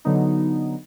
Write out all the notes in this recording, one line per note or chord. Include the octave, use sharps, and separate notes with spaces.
D3 F#3 B3 D#4